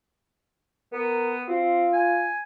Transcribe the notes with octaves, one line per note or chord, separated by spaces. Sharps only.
B3 A#4
C4 F4
G#5